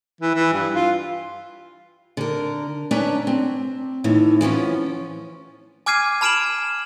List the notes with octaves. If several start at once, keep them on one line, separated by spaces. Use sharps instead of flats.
E3
E3
G2
F4
D3 A#4
C#4 D4 B4 E5 A#5
C4
A2 D#3 E3
E3 F3 B3 C#4
G#5 D6 F6 G#6 C7 D#7
A5 B5 F6 D7 E7 F#7